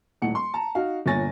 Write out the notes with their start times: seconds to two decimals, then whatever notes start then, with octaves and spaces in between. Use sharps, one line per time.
0.22 D#1 A2 F#5 C#7
0.35 C6
0.54 A5 A#5
0.75 D#4 F#4 F5
1.06 G1 A#2 C#5 G#5 A6 A#6